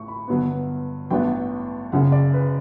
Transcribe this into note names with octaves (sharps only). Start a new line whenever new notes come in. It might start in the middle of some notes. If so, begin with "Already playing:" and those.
Already playing: A1 A2 C#6
B5
G1 G2 F#3 B3
A1 G2 F#3 B3 D4 G5
F#1 F#2 C#3 F#5
D5
B4